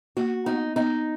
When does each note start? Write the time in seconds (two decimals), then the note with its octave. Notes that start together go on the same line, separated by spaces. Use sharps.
0.17 A#3 F#4
0.46 B3 D#4
0.76 B3 D#4